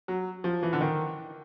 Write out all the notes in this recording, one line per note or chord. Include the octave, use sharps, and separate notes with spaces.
F#3
F3
E3
D3
D#3